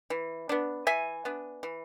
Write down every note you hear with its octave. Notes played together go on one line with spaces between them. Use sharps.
E3
B3 D4
E3 E5 G#5
B3 D4
E3